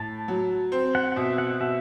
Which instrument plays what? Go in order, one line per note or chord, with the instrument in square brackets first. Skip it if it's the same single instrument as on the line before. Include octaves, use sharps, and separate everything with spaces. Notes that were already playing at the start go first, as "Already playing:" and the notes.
Already playing: [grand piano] A2 [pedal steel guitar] A5
[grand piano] F#3
C4
[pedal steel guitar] F#5
F#5
[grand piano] B2 [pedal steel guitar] E5
[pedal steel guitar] F#5
[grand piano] B2 [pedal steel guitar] E5